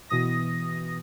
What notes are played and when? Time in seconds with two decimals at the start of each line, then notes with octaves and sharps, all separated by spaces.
0.09 B2 E3 D#6 A#6